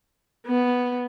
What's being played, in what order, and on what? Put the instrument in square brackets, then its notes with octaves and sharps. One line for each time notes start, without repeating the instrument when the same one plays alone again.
[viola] B3